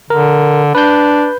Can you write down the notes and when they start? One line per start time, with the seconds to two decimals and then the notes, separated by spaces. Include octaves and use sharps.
0.10 D3 A#4
0.75 D4 B4 G6